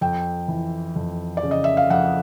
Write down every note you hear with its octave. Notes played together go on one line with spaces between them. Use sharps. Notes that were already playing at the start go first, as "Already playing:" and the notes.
F2 G5
E3
F2
D5
C#3
D#5
E5
F5
F2 F#5